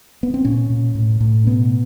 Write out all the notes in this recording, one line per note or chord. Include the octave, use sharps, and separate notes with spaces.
B3
C4
A#2 C#4
A#2
A2
A2
B2 B3